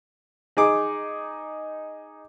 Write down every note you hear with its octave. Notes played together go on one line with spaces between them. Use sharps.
D#4 G#4 D6